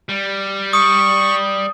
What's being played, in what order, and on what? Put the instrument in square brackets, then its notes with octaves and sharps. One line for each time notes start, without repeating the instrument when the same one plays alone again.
[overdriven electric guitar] G3
[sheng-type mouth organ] C#6 [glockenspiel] D#6